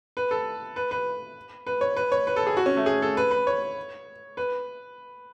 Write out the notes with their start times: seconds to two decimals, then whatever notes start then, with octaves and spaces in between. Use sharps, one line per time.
0.17 B4
0.31 A4
0.76 B4
0.91 B4
1.67 B4
1.81 C#5
1.97 B4
2.12 C#5
2.27 B4
2.36 A4
2.47 G#4
2.57 F#4
2.66 C#4
2.77 A3
2.86 G#4
3.02 A4
3.17 B4
3.31 B4
3.47 C#5
4.37 B4